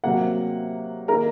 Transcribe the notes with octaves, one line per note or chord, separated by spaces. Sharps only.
C3 F#3 A#3 F#5
D#3 A#3 D#4 A#4 A#5